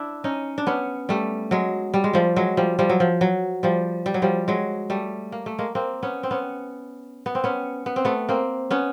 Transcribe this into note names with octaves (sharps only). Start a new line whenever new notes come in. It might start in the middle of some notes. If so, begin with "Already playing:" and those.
Already playing: D4 E4
C#4 D#4
D4
B3 C#4
G3 A3
F#3 G#3
G3
G#3
F3 G3
F#3 G#3
F3 G3
F3 G3
F#3
F3
F#3
F3 G3
G3
F#3
F3 G3
F#3 G#3
G3 A3
A#3
A3
G#3 A#3
A#3 C4
B3 C#4
C4
B3 C#4
B3
C4
B3 C#4
B3
C4
A3 B3
A#3 C4
B3 C#4